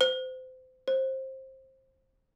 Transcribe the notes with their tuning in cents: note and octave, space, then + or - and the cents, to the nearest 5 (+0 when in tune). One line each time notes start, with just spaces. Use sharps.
C5 -30
C5 +20